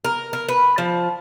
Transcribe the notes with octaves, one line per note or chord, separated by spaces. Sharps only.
A#4
A#4
B4
F3